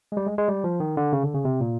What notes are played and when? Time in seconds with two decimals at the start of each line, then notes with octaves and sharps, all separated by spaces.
0.12 G#3
0.17 G3
0.26 G#3
0.38 G#3
0.49 G3
0.64 F3
0.80 D#3
0.97 D3
1.13 C#3
1.24 D3
1.34 C#3
1.45 C3
1.61 A#2